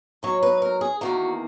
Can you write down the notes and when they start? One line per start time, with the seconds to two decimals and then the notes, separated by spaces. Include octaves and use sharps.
0.23 G#2 F#3 A#3 C#5
0.42 B4
0.62 A#4
0.81 G#4
1.01 E2 D#3 A#3 F#4